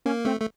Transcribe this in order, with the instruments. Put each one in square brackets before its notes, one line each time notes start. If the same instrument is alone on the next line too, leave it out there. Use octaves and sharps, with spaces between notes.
[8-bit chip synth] A#3 [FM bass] C#4
[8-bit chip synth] A3 [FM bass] C4
[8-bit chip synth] A3